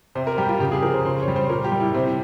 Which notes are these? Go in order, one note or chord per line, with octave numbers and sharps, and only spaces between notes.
C3 C5
A#4
G3 G4
F4
C#3 G4
G#4
F3 A#4
C5
C#3 C5
C#5
G3
C5
A#2 A#4
G4
G3
E4
C3 C4